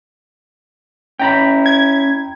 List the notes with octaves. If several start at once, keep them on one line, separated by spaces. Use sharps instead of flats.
C#4 E4 G5 A#5 B5
G#6